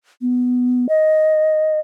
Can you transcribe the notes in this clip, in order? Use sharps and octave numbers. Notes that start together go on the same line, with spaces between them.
B3
D#5